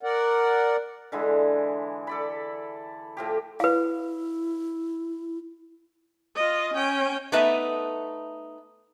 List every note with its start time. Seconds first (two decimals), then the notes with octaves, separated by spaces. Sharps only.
0.03 A#4 D5 F#5
1.12 D3 E3 G#3 E4
2.07 A4 D5 B5
3.17 A2 F3 G4
3.60 E4 B4 F5
6.36 F4 D#5
6.74 C#4 G5
7.32 A3 B3 D#4 B4 E5